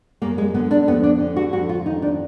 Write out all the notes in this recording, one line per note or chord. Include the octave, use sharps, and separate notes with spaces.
F#2 A#3
G#3
D3 B3
D4
F2 B3
D4
D3
F#4
F2 F#4
F4
D#3 D#4
D4